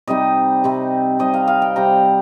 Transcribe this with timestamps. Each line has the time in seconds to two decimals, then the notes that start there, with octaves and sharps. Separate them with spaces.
0.07 C3 G3 C4 D#4 D#5
0.64 C3 G3 C4 D#4
1.19 C3 G3 C4 D#4 D#5
1.34 F5
1.47 F5
1.62 G5
1.76 C3 G3 C4 D#4 A#5